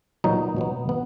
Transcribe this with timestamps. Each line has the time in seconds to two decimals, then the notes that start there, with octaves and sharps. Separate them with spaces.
0.24 A#2 F#3 B3 D#4
0.56 B2 F#3 B3
0.89 B3